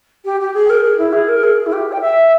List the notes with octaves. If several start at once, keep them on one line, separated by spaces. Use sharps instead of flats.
G4
G4
G#4
A#4
G#4
E4
G#4
A#4
G#4
E4
G4
G5
E5